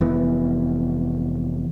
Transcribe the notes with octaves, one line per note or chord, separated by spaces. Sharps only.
F1 E3 B3